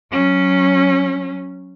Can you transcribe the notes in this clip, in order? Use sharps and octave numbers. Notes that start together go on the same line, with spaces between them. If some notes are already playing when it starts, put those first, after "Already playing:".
F#3 C#4